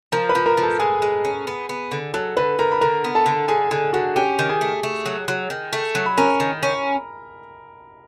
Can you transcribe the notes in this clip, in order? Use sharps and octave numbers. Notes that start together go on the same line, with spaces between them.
F3 A#4 A#5
B4 B5
F3
A#4 A#5
F3
A4 A5
G#3 G#4 G#5
G#3
C#4
B3
B3
D3
F#3 A4 A5
D3 B4 B5
D3 A#4 A#5
B5
D3 A#4 A#5
B3
A4 A5
D3
D3 G#4 G#5
D3 G#4 G#5
D3 F#4 F#5
C#4 G4 G5
D#3
G#4 G#5
A3
A3
F#3
F#3
D#3
A3
F#3
B5
C#4 A#4 A#5
D#3
C#4